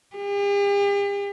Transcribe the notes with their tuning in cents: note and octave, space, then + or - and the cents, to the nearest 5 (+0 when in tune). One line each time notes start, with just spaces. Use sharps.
G4 +45